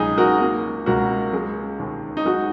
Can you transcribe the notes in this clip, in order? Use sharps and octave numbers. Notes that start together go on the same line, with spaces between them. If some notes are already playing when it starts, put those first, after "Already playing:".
Already playing: C#2 F#3 D#4 G#4
F#4 A#4
A#3
C#2 F#4 A#4
G#3
D#2
D#4
G#3 F#4